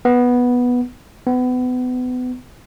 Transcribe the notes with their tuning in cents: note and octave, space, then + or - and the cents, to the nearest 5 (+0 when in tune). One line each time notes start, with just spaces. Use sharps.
B3 -5
B3 +30